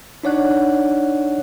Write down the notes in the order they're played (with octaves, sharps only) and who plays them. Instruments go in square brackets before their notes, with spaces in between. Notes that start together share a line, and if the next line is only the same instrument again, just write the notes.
[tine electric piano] D4 D#4 C#5 D5 F#5 F#6